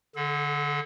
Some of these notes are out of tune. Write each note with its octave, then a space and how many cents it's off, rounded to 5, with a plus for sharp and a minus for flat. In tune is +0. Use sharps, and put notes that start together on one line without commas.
D3 +0 A4 -40